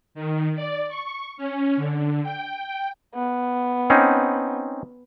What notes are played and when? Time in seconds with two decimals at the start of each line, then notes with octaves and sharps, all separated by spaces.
0.15 D#3
0.55 D5
0.89 C#6
1.37 C#4
1.76 D3
2.23 G5
2.62 G5
3.15 B3
3.90 C4 C#4 D#4